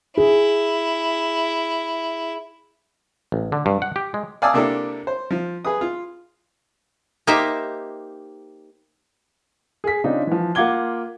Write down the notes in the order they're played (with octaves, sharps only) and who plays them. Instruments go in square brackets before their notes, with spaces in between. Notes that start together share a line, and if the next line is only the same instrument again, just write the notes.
[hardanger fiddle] E4 [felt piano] G#4
[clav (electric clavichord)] A1
D3
G2
F#5
G4
G#3
[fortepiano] D5 F5 G#5 A5 D#6 E6
C3 A#3 D4 E4 A4
C5
F3
G#4 B4 D#6
F4
[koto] A#3 D#4 G4 C5 E5 G5
[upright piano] G#4 B6
C#3 C4 D4 D#4 F4
E3 F3
A#3 F4 F#5 D6 G#6 G7